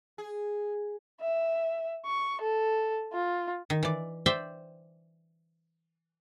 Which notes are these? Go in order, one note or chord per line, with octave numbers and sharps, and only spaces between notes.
G#4
E5
C#6
A4
F4
D#3
E3 D5
C5 D5 E5 G5